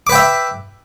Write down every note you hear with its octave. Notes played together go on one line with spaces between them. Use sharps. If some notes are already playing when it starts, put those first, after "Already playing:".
B4 E5 G5 D6